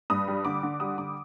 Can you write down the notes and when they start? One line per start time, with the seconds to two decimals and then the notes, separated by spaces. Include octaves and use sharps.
0.10 G2 D#6
0.28 G3
0.45 D3 D6
0.63 D3
0.80 G3 D#6
0.98 D3 D6